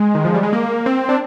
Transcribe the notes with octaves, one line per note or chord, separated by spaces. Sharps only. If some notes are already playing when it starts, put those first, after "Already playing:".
Already playing: G#3
D#3
F3
G3
G#3
A#3
C4
D4